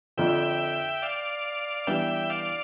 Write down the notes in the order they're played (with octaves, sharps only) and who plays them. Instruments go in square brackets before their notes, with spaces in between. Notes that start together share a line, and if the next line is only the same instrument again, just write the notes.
[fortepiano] F2 D3 F3 [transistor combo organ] E5 G5
[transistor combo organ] D5 F5
[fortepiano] E3 G3 B3 D4 [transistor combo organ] E5 G5
[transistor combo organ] D5 F5